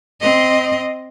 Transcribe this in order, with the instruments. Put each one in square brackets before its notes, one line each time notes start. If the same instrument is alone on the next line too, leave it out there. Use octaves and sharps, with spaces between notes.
[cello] C4 D#5